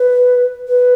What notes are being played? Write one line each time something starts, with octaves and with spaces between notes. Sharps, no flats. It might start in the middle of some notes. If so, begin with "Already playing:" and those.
Already playing: B4
B4